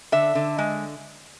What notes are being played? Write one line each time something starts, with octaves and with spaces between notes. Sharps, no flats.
D3 E5
D3
G#3